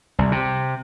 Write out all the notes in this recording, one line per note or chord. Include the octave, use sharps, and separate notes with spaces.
C2
C3